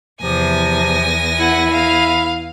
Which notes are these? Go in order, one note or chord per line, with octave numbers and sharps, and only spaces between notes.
E2 C3 F3 G#5 A#6
E4 F#5
F5